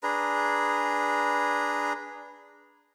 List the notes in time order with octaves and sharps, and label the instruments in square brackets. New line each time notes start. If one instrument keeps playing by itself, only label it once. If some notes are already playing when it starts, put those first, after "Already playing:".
[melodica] D4 G#4 B4 A#5